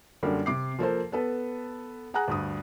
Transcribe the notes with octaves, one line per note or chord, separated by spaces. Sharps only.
F#2 D3 G3 A#3
C3 D6 C7
F3 A#3 A4 C5
B3 A4 B4
G#4 F#5 G#5 A#5 F#6
D2 G2 D#6